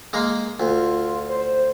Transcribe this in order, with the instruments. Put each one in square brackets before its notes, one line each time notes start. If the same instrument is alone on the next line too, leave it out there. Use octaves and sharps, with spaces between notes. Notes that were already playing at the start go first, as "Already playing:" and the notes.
[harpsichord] G#3 A#3 A#4
[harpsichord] D2 [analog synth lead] F4
[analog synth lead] C5